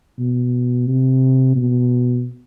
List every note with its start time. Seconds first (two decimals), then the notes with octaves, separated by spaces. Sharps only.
0.19 B2
0.87 C3
1.56 B2